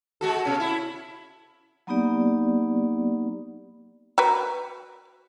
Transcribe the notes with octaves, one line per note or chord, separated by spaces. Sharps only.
G#3 F#4 A4
B2 C#4
E4
F#3 A#3 B3 D#4 G4 D5
F#4 A#4 B4